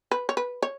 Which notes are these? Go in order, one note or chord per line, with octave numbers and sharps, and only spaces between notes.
B4
C#5
B4
C#5